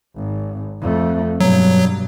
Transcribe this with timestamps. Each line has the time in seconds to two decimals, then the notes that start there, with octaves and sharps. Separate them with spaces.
0.15 G#1
0.81 F2 A3
1.41 G2 B2 F#3